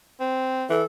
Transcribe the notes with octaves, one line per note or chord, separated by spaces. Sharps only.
C4
E3 A4